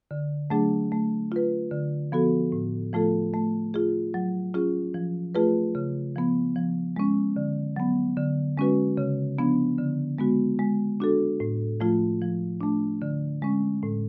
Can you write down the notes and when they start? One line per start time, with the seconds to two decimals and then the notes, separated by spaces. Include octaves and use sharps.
0.11 D3
0.50 F#3 A3 D4 G#4
0.92 A3
1.32 F4 B4
1.71 D3
2.12 F3 B3 F#4 A4
2.52 A2
2.93 F3 A3 F4 A4
3.34 A3
3.74 F4 G#4
4.14 F#3
4.54 C#4 F4 G#4
4.94 F3
5.35 A3 F4 G#4 B4
5.75 C#3
6.16 F3 B3
6.56 F3
6.96 G#3 C#4
7.36 D3
7.76 F#3 B3
8.17 D3
8.58 G#3 C#4 F#4 B4
8.97 C#3
9.39 F3 B3 D4
9.78 D3
10.18 G#3 B3 F#4
10.59 G#3
11.00 D4 F#4 A4
11.40 A2
11.80 F3 A3 F4
12.21 F3
12.61 A3 D4
13.02 D3
13.42 G#3 C#4
13.83 A2